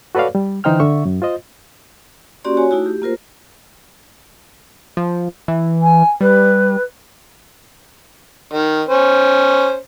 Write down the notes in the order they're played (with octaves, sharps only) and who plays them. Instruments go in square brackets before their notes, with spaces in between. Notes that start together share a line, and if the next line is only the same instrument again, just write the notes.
[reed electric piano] F#4 A4 B4 C#5 D5 F5
G3
D3 E3 D#4 C5 G5 F6
D3 E5 C#6
F#2
F4 C5 D#5
[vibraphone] A#3 C#4 F#4 G4 D5 C6
F#4 C#5 G#5
A3 D#4 E4 F#4
G4
A#3 F4 A#4 C5
[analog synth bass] F3
E3
[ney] G#5
[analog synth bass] G3 [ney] B4
[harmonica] D#3
C#4 C5